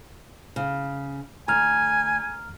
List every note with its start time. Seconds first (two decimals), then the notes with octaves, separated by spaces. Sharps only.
0.56 C#3
1.48 D2 G#5 A#5 F6